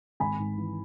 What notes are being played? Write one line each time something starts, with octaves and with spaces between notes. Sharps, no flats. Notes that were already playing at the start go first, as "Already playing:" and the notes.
G#1 G#5 B5
G#2
E3